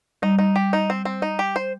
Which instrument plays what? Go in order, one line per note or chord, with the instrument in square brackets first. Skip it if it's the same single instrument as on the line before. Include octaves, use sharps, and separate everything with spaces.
[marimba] G3 [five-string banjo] D#4
[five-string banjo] D#4
G4
D#4
C4
C4
D#4
G4
C5